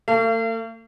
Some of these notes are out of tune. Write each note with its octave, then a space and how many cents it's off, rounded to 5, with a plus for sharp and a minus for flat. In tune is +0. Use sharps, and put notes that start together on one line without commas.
A3 +45 F5 -40